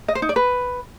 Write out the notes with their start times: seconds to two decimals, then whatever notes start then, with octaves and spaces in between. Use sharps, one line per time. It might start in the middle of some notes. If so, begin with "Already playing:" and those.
0.08 D#5
0.15 C5
0.22 D#4
0.29 D5
0.36 B4